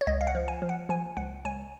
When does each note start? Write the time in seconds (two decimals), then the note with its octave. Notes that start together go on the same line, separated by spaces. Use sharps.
0.01 C#5
0.07 C#2 D#5
0.21 F5
0.27 F#5
0.35 F3
0.48 G#5
0.62 F3
0.69 F#5
0.89 F3 G#5
1.17 C#2 F#5
1.45 C#2 G#5